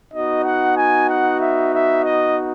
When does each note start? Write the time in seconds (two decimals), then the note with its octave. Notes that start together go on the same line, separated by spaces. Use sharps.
0.13 B3 D#4 F#4 D#5
0.44 F#5
0.77 G#5
1.10 F#5
1.41 E5
1.74 E5
2.05 D#5